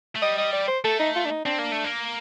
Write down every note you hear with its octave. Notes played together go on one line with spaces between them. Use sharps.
A3
G3 D#5
D#5
D5
C5
A3 A4
D#4
F4
D4
D#4
C4 D4
A#3
A3
A#3